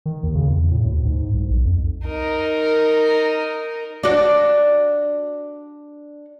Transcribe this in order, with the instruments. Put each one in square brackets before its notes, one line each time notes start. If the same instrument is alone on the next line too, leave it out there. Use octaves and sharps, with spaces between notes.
[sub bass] D#3
D#2
C#3
E2
A2
D2
G#2
C2
B1
F2
[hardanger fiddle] D#4 A#4
[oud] D4 F#4 D5